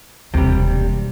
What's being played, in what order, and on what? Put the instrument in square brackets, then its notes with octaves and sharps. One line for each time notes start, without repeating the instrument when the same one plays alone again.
[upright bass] E1 D#2 [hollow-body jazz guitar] C3 G3